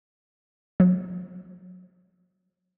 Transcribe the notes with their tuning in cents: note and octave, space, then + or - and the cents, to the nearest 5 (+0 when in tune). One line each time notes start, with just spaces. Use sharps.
F#3 -25